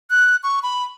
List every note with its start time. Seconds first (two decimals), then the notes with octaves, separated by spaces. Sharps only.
0.11 F#6
0.43 C#6
0.63 B5